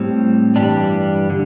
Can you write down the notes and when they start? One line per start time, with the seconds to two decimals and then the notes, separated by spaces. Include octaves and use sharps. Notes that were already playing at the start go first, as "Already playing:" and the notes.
Already playing: A2 G3 C4
0.56 G2 E3 G3 D4 G4
1.30 D3